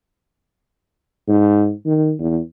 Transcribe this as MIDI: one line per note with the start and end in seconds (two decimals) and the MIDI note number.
1.28 1.72 44
1.86 2.14 51
2.19 2.40 40